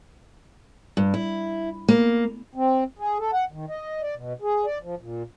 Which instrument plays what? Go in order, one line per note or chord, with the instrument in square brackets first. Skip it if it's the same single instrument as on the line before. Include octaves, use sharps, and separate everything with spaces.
[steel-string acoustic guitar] G2
E4
A#3
[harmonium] C4
G#4
A4
F#5
D#3
D#5
D5
B2
G#4
D5
F3
A#2